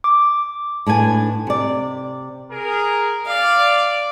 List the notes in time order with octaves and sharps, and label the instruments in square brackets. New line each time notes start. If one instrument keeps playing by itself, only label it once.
[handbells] D6
[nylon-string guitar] A2 D4 B4 G#5
C3 D5
[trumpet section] G#4 A#4
[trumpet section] D5 [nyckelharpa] F5